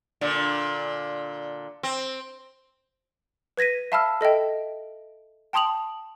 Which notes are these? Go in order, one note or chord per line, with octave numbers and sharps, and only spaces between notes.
A#2 D3
C4
B4 G#6 A#6 B6 D#7
E5 F5 A5 B5 E6 F6
A4 D#5 E5 G5
G5 A5 C6 D#6 F7 F#7